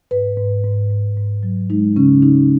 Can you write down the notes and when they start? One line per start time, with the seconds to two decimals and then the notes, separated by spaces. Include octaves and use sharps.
0.11 G#2 B4
0.37 G#2
0.64 G#2
0.90 G#2
1.17 G#2
1.43 F#3
1.70 G#3 D#4
1.96 C#3 C#4
2.23 C#3 D#4